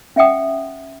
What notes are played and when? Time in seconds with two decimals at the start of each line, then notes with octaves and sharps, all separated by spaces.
0.16 C#4 E5 F#5 G5 D#6